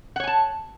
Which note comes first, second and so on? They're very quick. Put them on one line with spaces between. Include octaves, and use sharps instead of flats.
F#5 C#5 G#5 A5